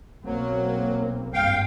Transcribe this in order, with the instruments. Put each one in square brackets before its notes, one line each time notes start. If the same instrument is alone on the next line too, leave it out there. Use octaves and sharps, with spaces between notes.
[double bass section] B1 A#3 C4 [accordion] F#3
[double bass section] G#1 G2 [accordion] F5 G5